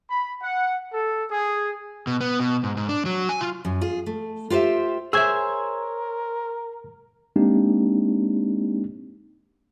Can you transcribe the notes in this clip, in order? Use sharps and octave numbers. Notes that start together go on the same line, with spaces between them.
B5
F#5
A4
G#4
B2
B3
B2
G#2
G#2
D4
F#3
G#5
F4
F#2
F4 G#4
A3
F4 G4 B4 C5 E5
G#4 A#4 C5 C#5 E5 G#5 E6 G#6
G#3 A#3 C4 D4 D#4 G4